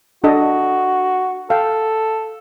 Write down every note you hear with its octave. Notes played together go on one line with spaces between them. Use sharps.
D4 F#4 A4 D#5
A4 F5 G5